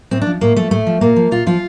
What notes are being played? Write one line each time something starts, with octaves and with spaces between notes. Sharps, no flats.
A2 C4
D4
F3
A2 A#3
F3 A3
A2 A3
F3
A#2 A#3
F3
A#2 F4
F3 F4